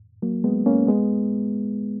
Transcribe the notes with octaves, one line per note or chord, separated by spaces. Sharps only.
F#3 A#3
G#3 B3
A#3 C#4
G#3 B3